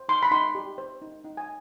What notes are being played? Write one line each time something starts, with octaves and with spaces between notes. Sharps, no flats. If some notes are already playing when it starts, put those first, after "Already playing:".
Already playing: C5
D#4 C6
B5
D#4 C6
G4
C5
D#4
D#4
G#5